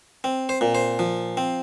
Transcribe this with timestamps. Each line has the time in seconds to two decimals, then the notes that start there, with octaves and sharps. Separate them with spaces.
0.24 C4
0.49 C5
0.61 A#2
0.75 C5
0.99 F3
1.37 C4